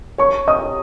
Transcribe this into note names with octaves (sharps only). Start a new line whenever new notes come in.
C#5 C#6
D#5 D#6